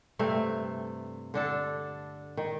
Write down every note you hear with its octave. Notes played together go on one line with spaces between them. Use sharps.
G2 C3 A3
D3 D4 A4
D#3